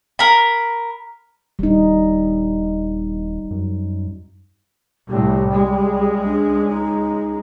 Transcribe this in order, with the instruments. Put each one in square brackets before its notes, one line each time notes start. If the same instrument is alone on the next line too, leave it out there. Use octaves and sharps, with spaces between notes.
[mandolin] A#4 B5
[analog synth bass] D#1 [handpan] G3 D#4
[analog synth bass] F#2
[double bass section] C2 A2 [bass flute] G3
[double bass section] C#2 G#3
[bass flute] D4
D#4